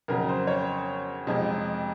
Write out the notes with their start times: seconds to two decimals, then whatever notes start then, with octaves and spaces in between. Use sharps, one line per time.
0.08 F2 C#3 F#3 A#4
0.29 C5
0.47 C#5
1.27 F2 C3 F3 G#3